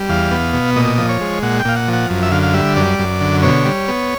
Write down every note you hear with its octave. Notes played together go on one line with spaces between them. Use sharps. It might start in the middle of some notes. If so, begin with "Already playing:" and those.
Already playing: G3
E2 F5
B3
B2
A#2 D#5
F3
C#5
G#3
A#2 F#5
G5
A#2 F5
F#5
F3
F#5
F#2
E5
D3 F5
F5
G3 E5
F#2 D5
F#2
D3
B2 C#5
G3
B3